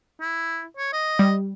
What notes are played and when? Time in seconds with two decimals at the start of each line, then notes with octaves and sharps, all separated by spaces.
0.21 E4
0.77 C#5
0.93 D#5
1.19 G3